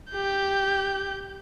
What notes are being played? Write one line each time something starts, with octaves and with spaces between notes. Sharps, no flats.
G4 G6